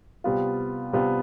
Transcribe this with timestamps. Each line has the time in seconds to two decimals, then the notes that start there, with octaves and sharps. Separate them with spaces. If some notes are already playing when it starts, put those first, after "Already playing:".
0.24 C3 G3 B3 F4
0.93 C3 G3 B3 F4